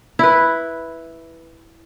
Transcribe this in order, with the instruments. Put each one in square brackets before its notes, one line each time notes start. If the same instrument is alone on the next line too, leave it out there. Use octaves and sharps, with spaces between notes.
[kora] E4 B4